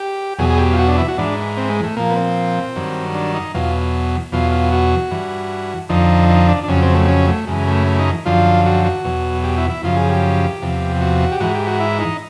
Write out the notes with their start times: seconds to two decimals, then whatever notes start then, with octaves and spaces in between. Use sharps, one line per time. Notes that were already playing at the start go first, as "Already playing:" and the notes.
Already playing: G4
0.38 E2 B2 F#3 G#4
0.49 G#4
0.58 G4
0.73 F4
0.79 F#4
0.88 D4
0.98 E4
1.08 F#4
1.18 G#2 E3 D4
1.57 C4
1.70 G#3
1.83 A3
1.97 A#2 F3 A#3
2.10 B3
2.16 C4
2.76 G2 D#3 F#3
3.14 D4
3.34 D#4
3.54 E2 B2 F#3 F4
4.32 E2 B2 F#3 F4
4.52 F4
4.72 F#4
5.11 G2 E3
5.89 F2 D3 F3 D#4
6.30 D#4
6.48 D4
6.64 D4
6.68 F2 C#3 F#3 C#4
6.82 C4
6.95 A3
7.08 C#4
7.27 A3
7.47 F#2 C#3 E3 G#3
7.68 A3
7.87 A3
7.99 D#4
8.25 F#2 D3 F3 F4
8.66 F#4
8.85 F#4
9.04 E2 B2 F#3
9.44 G4
9.58 E4
9.70 E4
9.83 F#2 C#3 F3 F4
9.96 G#4
10.10 G4
10.62 E2 C3 F3
11.01 F#4
11.32 G4
11.40 G#2 E3 F#4
11.55 G4
11.67 F#4
11.80 E4
11.99 D#4